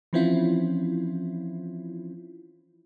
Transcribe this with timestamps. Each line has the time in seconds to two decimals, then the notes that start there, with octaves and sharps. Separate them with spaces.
0.13 E3 F3 C4 C#4 E4 F4